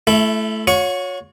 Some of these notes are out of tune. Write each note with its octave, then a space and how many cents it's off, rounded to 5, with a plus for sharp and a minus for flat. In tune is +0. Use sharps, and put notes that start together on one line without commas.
A3 -15 E4 +20
F#4 -45 C#5 +5 C#6 +0